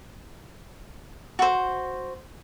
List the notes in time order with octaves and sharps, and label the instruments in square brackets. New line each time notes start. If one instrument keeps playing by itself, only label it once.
[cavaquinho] F#4 C5